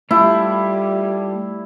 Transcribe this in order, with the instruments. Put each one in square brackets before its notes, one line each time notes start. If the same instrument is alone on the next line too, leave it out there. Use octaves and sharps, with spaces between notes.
[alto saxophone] G3 [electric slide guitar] A3 F4 G4 [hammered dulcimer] E4